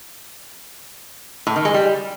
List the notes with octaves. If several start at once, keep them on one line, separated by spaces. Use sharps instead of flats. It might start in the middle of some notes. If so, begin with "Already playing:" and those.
A2
D#3
G#3
G3